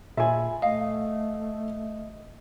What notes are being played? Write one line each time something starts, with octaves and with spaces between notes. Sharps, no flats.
A#2 F4 G#4 E5 G#5 B5
A3 D#5 F5